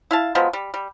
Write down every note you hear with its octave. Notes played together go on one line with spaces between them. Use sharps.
E4 F5 A5
F3 F#3 G#3 B3
G3
G3